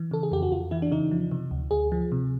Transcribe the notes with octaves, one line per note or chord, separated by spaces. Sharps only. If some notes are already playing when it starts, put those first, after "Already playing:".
Already playing: E3
C#3 A4
G#4
F2 G4
F#4
F2 F4
E3 E4
D4
C#3 D#4
F3
C3
D2
D2 G#4
F3
C3